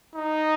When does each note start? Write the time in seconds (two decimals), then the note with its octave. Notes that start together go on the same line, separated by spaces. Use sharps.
0.15 D#4